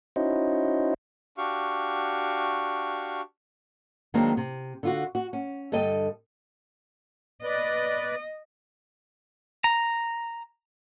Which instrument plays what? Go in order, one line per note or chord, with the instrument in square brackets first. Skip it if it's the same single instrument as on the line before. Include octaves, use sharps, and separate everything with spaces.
[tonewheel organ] C#4 D#4 E4 F#4 C5 D#5
[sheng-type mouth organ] D4 F#4 G4 F5 C#6
[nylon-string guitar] D#3 F#3 G#3 A#3 C4 D4
C3
D3 F4 F#4
F#4
C#4
G2 D3 A4 D#5 G5
[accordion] B4 D5 [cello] D#5
[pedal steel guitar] A#5